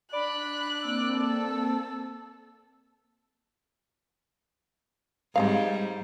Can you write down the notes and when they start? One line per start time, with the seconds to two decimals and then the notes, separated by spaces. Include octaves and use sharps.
0.14 D4 D5 B5 F#6
0.82 A#3 C4 E6
1.15 A4
5.36 G#2 G3 G#3 C4 F5